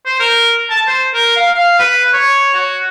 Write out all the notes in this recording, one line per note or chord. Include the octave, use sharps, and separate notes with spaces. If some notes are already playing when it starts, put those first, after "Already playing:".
C5
A#4
A5
C5
A#4
F5
F5
B4
C#5
F#4